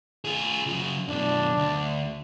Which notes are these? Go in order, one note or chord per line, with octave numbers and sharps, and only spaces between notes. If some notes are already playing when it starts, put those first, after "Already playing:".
F4 G#4
C#3 F#3
F#2 B2 D4
D2